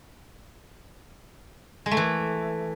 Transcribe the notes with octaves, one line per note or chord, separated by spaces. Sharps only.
G#3
A3
E3